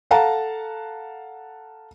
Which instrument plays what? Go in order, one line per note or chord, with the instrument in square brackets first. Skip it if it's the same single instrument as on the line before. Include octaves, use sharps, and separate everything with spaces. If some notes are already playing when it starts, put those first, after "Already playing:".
[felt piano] A4 F5 F#5 A5 A#5